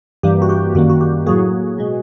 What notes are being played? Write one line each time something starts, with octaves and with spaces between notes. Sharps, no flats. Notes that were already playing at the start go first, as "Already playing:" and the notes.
G2 E3 G3 A#3 G4
F#4
G4
F#2 D#3 G3 A#3 F#4
F#4
G4
A2 F#3 A#3 F#4 G#4
B2 G#3